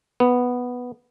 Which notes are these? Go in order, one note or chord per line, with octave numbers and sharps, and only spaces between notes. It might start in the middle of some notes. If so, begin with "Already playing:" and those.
B3